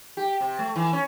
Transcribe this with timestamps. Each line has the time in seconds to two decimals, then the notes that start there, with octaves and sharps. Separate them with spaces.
0.17 G4
0.41 C3
0.59 A3
0.76 E3
0.93 C#4